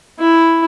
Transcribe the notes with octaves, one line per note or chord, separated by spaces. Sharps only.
E4